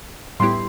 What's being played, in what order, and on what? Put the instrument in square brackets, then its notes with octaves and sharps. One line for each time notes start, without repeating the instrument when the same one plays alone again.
[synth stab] A2 G3 B3 E4 G4 [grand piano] C6